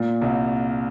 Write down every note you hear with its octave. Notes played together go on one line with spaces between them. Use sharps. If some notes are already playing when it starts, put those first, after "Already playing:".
Already playing: A#2
C2